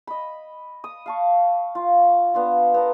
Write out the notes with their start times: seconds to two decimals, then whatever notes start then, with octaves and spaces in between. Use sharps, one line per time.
0.07 D#5 B5
0.84 D#6
1.06 F5 A5 C#6
1.75 F4
2.34 B3 D4 F4
2.74 B3 A4 A#4